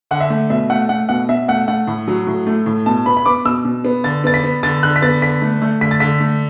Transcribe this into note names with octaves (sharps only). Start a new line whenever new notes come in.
D3 F#5
E5
A3
B2 E5
A3 F#5
A3 F#5
B2 F#5
B2 E5
A3 F#5
A3 F#5
A2
F#3
A2
A3
A2
B2 A5
B3 B5
B5
B3 D6
B2 E6
B2
B3
D3 A6
B3 A6
B6
B3
D3 A6
D3 F#6
B6
B3 A6
D3 B6
A3
A3
D3 B6
A6
D3 B6
A3